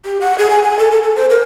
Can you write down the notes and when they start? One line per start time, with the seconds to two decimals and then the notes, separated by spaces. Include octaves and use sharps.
0.05 G4
0.21 F#5
0.38 G#4
0.50 G#5
0.64 G#5
0.79 A4
0.92 A4
1.03 A4
1.16 C5
1.30 A#4